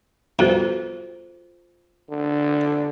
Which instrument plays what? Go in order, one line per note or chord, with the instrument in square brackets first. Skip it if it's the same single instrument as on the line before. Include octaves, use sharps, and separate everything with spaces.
[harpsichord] G2 B2 [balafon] F4 A4 C5
[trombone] D3